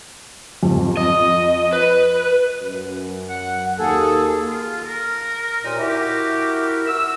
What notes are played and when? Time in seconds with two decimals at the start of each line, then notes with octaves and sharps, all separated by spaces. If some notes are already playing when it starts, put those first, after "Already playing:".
0.63 F2
0.97 D#5
1.73 B4
2.61 F#2
3.29 F#5
3.79 D#2 A#3 G#4 A4
4.46 F4
4.84 A#4
5.64 D#2 A#2 D#4
5.79 E4 F#4 G4 A#4
6.87 E6